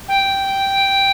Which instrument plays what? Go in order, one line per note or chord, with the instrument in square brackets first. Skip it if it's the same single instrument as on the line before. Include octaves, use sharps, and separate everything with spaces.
[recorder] G5